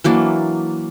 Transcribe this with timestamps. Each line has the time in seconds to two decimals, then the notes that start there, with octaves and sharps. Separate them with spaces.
0.04 E3 F#3 A#3 D4